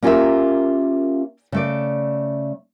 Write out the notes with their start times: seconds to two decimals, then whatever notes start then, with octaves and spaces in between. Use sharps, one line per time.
0.03 A#3 C#4 F4 G4 A#4 E5
1.52 C#3 A3 D5